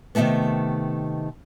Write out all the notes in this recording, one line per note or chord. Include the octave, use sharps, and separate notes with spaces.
C3 D#3 E3 G#3 A3 B3